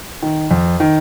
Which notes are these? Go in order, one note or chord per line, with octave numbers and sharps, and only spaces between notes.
D#3
F2
D#3